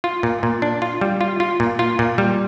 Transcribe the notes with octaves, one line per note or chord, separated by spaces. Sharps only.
F4
A#2
A#2
D4
F4
G3
F4
F4
A#2
F4
A#2
G3